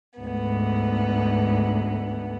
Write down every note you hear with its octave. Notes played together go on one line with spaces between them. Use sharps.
D2 G#2 B3